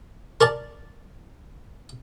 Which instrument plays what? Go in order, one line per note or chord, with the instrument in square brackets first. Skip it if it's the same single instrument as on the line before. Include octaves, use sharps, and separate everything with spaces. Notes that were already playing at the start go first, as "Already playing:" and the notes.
[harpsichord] A#4 D5 A5